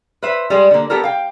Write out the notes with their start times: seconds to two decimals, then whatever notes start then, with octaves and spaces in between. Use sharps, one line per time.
0.23 B4 C5 E5
0.50 G3 G#3 G#4
0.71 D3 A#3
0.90 B3 G4 A4 A#4
1.04 F5 G5